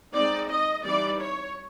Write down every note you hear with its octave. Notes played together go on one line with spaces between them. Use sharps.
G#3 C4 D#4 D5
D#5
E3 G3 C4 D#4 D5
C#5